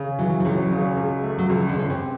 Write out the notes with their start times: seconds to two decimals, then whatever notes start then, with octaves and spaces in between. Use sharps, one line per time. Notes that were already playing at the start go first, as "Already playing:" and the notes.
Already playing: C#3
0.19 E3 F#3
0.40 F3
0.45 C#2 F#3
0.71 C#3
0.97 C#2
1.24 A3
1.39 F#3
1.50 C#2 F3
1.69 D3
1.76 C#2 C#3
1.90 C3